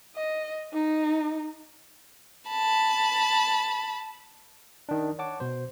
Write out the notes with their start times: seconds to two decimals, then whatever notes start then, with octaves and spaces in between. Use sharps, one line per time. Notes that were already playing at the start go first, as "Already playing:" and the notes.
0.16 D#5
0.73 D#4
2.49 A5 B5
4.89 D#3 D4
5.19 C#5 F#5 A5 D6
5.40 B2 C5